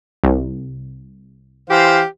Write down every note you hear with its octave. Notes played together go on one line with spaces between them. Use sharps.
C2
E3 G4 C5 F5